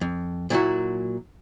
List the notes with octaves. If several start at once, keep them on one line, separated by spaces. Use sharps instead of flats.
F2
A#2 F#3 E4 F#4